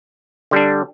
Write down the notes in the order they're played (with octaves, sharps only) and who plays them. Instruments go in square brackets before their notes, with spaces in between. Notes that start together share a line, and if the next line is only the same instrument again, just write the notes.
[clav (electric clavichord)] D3 G3 D4